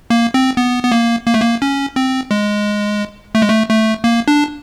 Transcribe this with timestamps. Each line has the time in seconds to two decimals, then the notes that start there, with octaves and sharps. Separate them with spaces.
0.10 A#3
0.34 C4
0.57 B3
0.83 B3
0.92 A#3
1.27 A#3
1.34 A3
1.41 A#3
1.62 C#4
1.96 C4
2.31 G#3
3.35 A3
3.42 G#3
3.49 A3
3.69 A3
4.04 A#3
4.28 D4